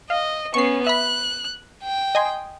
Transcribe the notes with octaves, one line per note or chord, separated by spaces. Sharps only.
D#5 F5
B3 C#4 C#6 C7
E5 B5 F#6
G5
D#5 G#5 C6